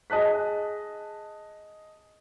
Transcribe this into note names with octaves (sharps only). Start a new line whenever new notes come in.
G#4 D#5 A5 F#6 B6